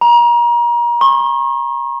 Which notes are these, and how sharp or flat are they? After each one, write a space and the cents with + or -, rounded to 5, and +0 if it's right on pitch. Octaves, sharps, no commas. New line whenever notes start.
A#5 +35
C#6 -40